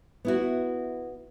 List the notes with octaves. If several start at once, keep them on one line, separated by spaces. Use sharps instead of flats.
B3 E4 F#4